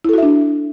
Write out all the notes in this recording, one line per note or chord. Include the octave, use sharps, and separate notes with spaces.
D4 E4 F#4 A4 E5